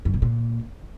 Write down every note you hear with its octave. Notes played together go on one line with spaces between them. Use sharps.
F#2
B2
A#2